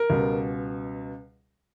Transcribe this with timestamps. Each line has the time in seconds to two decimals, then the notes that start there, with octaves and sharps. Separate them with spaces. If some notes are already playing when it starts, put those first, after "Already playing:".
Already playing: A#4
0.10 C#2 B2 G3